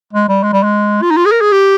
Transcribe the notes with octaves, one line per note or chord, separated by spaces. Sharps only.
G#3
G3
G#3
G3
G#3
F4
D#4
F4
G#4
A#4
G#4
G4